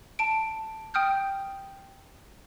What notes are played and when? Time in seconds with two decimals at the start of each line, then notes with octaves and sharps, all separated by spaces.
0.19 A5 D7
0.94 G5 D#6 F6 G6